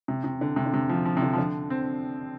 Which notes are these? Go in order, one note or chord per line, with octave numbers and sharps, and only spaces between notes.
C3
C3
D3
C3
D3
C3
F3
F3
C3
D3
F3
D3
C4